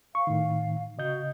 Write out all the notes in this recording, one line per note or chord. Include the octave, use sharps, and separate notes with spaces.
F5 C#6
A2 D#3
C#3 F#4 D#5 G6